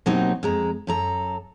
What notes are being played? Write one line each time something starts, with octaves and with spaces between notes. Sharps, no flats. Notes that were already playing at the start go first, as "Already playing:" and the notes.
B2 F#3 A#3 C4 D#4 G4
F2 G#3 A#5
F#2 A4 A#5